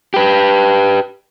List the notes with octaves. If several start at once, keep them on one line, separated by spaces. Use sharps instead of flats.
G4 B4